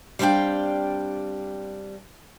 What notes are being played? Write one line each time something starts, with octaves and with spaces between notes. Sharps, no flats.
G3 B3 C4 D4 F5 G5